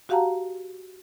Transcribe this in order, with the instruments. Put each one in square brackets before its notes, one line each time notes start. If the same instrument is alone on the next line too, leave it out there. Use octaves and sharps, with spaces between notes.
[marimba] F#4 G4 F5 F#5 A5 A#5